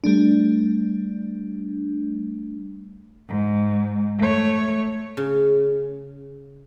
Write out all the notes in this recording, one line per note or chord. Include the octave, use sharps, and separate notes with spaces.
G3 A3 D4
G#2
A3 C#5
C#3